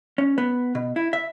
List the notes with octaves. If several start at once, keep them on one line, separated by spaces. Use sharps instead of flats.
C#4
B3
B2
E4
E5